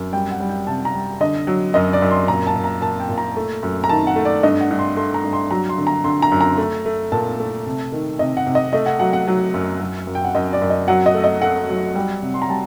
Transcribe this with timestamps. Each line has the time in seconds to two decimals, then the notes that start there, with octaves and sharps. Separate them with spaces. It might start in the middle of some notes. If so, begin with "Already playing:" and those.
Already playing: F#2
0.13 G3 G5
0.31 F#5
0.40 G3
0.49 G5
0.67 C3 A5
0.85 A#5
0.95 G3
1.20 D3 D#5
1.47 F#3
1.74 F#2 D#5
1.93 D5
2.02 F#2
2.11 C6
2.28 A#2 A#5
2.47 A5
2.56 A#2
2.64 A#5
2.82 A#2 A5
3.00 G5
3.09 A#2
3.18 A#5
3.36 A3
3.63 F#2
3.84 A#5
3.89 D#3 A5
4.07 F#5
4.16 A3
4.25 D5
4.43 G2 D#5
4.61 F#5
4.71 G2
4.79 C6
4.96 A3 C6
5.14 A#5
5.24 G2
5.33 C6
5.50 F#3 A#5
5.69 C6
5.78 D3
5.87 A#5
6.04 D3 C6
6.22 A#5
6.32 F#2
6.41 A#5
6.58 A3
6.86 A3
7.12 A#2 A5
7.39 A3
7.66 C3
7.92 D#3
8.19 C3 D#5
8.37 F#5
8.47 C3
8.55 D#5
8.73 A3 D#5
8.86 F#5
8.99 F#3 F#5
9.13 F#5
9.28 F#3
9.54 F#2
9.81 F#2
10.07 F#2
10.15 G5
10.25 F#5
10.35 F#2 D#5
10.53 D5
10.62 F#2
10.70 D#5
10.88 F#3 F#5
11.06 D#5
11.14 A3
11.24 D#5
11.42 A3 F#5
11.69 F#3
11.95 G3
12.22 C3
12.34 C6
12.42 A#5
12.49 G3 A5